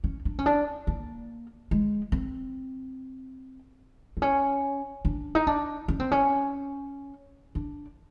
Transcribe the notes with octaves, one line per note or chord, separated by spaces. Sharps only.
C#4
D4
C#4
D4
A#3
G#3
C4
C4
C#4
D4
D#4
D4
C#4
C4
C#4
D4